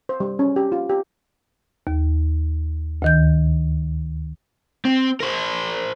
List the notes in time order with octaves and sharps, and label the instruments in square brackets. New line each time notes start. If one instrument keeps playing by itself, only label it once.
[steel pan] C5
G3
C#4
G4
F4
G4
[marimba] D#2
D2 D#3 G6
[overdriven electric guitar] C4
A#4 C5